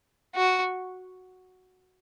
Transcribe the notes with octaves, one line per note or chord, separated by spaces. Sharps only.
F#4